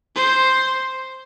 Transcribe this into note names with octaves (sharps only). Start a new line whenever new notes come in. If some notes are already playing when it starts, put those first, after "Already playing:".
C5